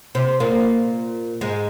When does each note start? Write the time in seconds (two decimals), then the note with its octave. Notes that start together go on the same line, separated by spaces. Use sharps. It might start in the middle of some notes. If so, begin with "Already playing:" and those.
0.15 C3 C4
0.40 A#2 A#3
1.41 G#2 G#3